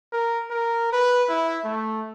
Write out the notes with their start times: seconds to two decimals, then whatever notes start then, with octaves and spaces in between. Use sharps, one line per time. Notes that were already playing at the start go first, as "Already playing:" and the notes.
0.13 A#4
0.51 A#4
0.93 B4
1.30 E4
1.65 A3